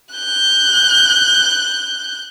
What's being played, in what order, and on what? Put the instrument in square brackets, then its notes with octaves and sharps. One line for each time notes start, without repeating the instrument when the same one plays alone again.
[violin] F#6 G6